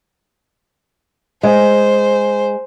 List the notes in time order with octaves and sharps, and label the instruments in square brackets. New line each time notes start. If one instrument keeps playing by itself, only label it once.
[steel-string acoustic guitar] G#3 [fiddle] C5